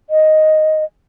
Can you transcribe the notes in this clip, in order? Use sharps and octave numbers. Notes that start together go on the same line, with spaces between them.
D#5